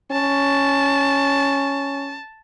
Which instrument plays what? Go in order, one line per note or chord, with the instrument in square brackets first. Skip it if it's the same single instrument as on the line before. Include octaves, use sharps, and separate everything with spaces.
[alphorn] C#4 [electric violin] A5